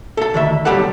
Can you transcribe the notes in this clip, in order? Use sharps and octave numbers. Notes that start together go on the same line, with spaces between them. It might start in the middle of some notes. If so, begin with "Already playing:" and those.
A4 A5
D2 D#3 E5
B1 A2 G3 G4 A4 F#5